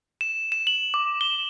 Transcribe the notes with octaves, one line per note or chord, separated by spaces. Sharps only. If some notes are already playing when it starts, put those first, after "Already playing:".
E7
E7
F#7
D6
G7